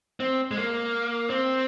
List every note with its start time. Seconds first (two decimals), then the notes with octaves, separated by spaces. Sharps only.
0.20 C4
0.51 G#3
0.57 A#3
1.30 C4